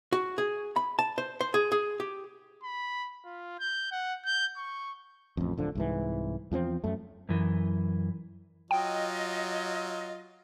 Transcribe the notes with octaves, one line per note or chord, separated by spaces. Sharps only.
F#4
G#4
B5
A5
C5
C5
G#4
G#4
G4
B5
F4
G6
F#5
G6
C#6
A1 F2
D1 D3 F3
C2 G#2 E3
E2 F3 B3 C4
F#2 A3
F#2 E3
F#3 F4 D#5 G5